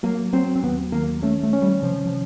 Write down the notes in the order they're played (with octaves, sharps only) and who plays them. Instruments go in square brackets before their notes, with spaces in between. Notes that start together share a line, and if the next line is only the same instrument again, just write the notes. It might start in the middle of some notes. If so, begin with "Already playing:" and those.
[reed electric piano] F#3 [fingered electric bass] A#3
[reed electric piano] F#3 [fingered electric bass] C4
[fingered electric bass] C4
[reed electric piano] D#2 [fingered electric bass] B3
[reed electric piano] D#3 [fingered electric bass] A#3
[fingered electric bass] A3 [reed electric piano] C#4
[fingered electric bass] A3
[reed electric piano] C#4
[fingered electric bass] G3
[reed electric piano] C3 [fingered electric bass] F3
[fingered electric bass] F3